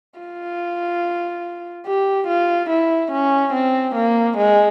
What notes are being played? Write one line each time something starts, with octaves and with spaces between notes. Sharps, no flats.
F4
G4
F4
E4
C#4
C4
A#3
G#3